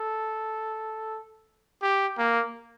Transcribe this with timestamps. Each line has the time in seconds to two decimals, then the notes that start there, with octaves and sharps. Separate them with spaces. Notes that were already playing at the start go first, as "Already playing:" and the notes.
Already playing: A4
1.82 G4
2.18 A#3